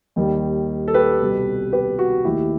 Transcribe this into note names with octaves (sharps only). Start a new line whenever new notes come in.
D#2 D#3 G3
A4
G4 B4
C2 B2 G3
G4 B4
F#4
D#2 D#3 A3 E4 G4